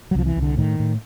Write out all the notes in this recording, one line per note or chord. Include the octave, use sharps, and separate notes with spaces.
F#3
C2 F3
E3
C2
D3
A2 D#3
A2